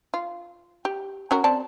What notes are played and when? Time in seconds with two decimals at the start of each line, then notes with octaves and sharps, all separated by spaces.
0.14 F4
0.85 G4
1.31 C#4 F#4 A#4
1.44 C4 D5 A5